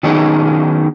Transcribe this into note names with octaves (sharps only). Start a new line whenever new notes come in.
D#3 F#3 B3 C#4 D#4 G#4